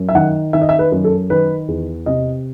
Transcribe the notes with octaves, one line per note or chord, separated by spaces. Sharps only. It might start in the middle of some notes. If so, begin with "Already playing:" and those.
Already playing: F#2
E5
D#3 F#5
D#3 E5
D#5
E5
B4
F#2
A4
D#3 B4
E2
C3 D#5